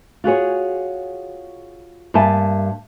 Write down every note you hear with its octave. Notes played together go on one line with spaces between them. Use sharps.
F4 F#4 G#4 C#5
G2 A#3 E5 G#5 A5